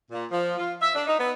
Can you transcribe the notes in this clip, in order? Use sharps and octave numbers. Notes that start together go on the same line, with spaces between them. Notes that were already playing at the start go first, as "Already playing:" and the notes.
A#2
F3
F4
E5
D4
D#4
B3